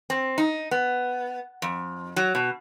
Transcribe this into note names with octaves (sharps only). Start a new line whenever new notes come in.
C4
D#4
B3
F2
F#3
B2